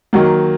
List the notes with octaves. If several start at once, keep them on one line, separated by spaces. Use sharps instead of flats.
D#3 F#3 A#3